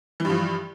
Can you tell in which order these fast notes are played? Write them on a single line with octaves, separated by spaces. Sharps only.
E3 G2 F3